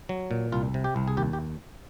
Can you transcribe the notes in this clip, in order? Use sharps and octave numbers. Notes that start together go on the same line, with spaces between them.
F#3
A#2
C2 F4
C3
G4
C2
G#4
D#2 G4
G4